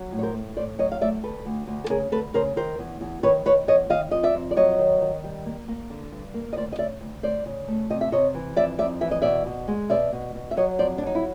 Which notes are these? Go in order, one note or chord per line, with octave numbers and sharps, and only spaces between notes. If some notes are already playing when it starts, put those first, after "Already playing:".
Already playing: F#3
A2
C#5
A#4 C5
A3
A2 C5 D5
F#3 C#5 D#5
F5
A3 D5 E5
D2 A4 B4
D2
D2
A4
C#3 G#4 A#4
D2 A4 B4
C#3 A#4 C5
D#3 A#4 C5
E2
E2
D#3 B4 C#5
D#3 B4 C#5
E2 C#5 D#5
D#3 D#5 F5
F2 D#5
D5 E5
F2
D5
F#3 C#5 D#5
D#3
D#3
G3
A#3
A#3
D3
G2
A#3
D#5
D2 C5 D5
D#5
C#3 D5 E5
D2
D2 C5 D5
C#3
A3
C3 D#5
E5
C3 C#5 D#5
E3
F2 D5 E5
F2 D5 E5
E3 E5
D#5
B2 D5 E5
B2
G#3
B2 D5 E5
B2
B2
E5
F#3 C#5 D#5
F2 C5 D5
D4
F#3 D#4
E4